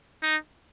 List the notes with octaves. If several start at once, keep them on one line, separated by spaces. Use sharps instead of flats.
D#4